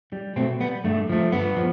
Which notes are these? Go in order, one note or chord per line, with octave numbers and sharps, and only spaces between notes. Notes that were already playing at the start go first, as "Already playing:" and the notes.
G3
B2 A3 C4
G3 B3
G2 A3
F3 A3
G2 B3
F3